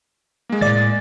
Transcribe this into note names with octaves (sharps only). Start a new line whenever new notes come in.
G#3 A#3
A2 D5 A6